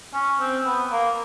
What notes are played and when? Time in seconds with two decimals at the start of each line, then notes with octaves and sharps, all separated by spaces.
0.14 C#4
0.40 C4
0.65 B3
0.92 A#3